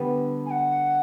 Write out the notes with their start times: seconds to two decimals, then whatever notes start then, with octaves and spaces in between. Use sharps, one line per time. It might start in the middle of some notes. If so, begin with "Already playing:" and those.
Already playing: D3 G3 B3
0.46 G#5
0.50 F#5